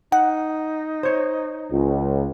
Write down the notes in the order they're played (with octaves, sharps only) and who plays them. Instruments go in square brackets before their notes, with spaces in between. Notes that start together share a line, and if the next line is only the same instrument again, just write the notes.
[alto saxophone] D#4 [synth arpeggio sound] F#5
[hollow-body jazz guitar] C5 C#5
[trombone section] C#2